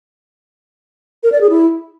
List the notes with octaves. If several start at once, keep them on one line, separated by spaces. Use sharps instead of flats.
A#4
D5
G#4
E4